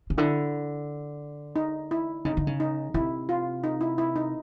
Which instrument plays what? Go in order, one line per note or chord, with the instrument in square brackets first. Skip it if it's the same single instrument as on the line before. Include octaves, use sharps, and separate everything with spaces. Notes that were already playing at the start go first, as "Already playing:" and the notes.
[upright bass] C#3
[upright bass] D3 [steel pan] E4
[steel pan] D#4
E4
[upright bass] C#3 [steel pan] D#4
[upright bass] D3
C#3
[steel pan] D#4
[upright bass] C3 [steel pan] E4
[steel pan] F4
D#4
E4
E4
D#4